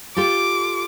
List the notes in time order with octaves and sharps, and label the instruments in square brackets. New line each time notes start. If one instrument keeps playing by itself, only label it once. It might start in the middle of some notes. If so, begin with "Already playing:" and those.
[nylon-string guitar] F4 G4 A4 [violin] D6